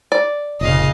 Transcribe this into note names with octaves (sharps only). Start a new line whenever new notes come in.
D5
F1 A#2 C#3 D#5 F5